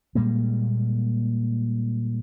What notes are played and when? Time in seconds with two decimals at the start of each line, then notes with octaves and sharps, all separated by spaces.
0.15 A#2 G3 G#3 A#3